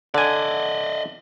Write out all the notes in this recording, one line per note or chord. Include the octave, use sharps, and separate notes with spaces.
D3 D5 D#5 G#5